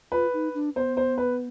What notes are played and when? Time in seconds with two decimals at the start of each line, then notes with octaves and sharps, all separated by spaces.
0.12 F4 B4
0.33 D#4
0.54 D4
0.76 B3 C5
0.97 C5
1.18 B4